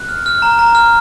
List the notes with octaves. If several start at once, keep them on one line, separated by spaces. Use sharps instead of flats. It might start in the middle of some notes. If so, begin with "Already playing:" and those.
Already playing: F#6
F6
F6
A#5
A#5
F6